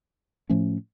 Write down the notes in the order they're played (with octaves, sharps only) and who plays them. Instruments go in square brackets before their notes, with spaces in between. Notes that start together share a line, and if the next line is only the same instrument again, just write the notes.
[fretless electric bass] A2 F3 A3 C#4